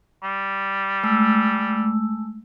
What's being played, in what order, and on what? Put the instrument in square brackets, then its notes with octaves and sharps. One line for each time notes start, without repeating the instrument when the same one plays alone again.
[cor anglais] G3
[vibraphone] G#3 A3 E6